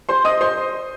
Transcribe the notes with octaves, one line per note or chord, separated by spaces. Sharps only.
C5 C6
D#5 D#6
C5 C6